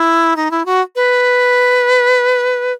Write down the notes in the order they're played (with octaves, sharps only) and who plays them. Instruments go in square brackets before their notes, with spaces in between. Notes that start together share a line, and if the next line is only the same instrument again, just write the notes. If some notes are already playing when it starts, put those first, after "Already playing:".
Already playing: [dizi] E4
D#4
E4
F#4
B4